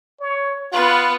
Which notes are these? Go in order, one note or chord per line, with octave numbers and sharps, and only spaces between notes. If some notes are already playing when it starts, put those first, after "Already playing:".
C#5
B3 F4 B4